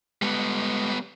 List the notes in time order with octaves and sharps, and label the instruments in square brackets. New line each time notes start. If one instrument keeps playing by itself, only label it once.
[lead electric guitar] G3 B3 [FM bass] G#3